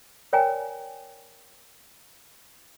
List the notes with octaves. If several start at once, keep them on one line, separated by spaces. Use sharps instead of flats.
A#4 C#5 D5 G5 G#5 A#5